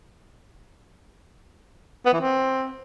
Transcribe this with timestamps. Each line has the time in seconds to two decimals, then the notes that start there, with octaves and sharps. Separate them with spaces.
2.06 B3
2.13 E3
2.21 C4